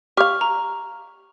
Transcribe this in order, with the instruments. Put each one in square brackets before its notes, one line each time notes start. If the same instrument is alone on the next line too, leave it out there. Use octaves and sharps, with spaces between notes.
[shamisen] G4 F5 [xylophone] C#6 F6
[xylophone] A#5